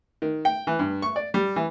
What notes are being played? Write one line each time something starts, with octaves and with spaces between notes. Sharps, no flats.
D#3
G5
E3
G2
C#6
D5
G3
E3